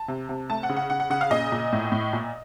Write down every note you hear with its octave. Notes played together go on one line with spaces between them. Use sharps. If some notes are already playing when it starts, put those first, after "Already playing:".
Already playing: A5
C3
C3
A3 A5
F#5
C#3
F#5
C#3 F#5
F#5
C#3 F#5
F5
A#2 D#5
A#2
A2
A2
A#2